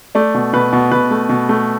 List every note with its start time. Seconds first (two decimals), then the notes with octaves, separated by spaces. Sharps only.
0.15 A3 D5
0.34 B2
0.53 B2 B4
0.73 B2
0.92 B2 B4
1.11 A3
1.29 B2
1.49 A3